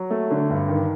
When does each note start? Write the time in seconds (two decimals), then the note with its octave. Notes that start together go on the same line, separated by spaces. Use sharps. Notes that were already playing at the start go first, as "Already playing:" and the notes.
Already playing: F#3
0.11 A3
0.30 D3
0.50 G2
0.68 D#3